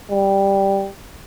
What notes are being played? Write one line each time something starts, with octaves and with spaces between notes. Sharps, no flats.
G3